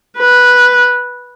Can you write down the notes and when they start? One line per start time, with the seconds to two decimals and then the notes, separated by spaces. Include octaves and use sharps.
0.19 B4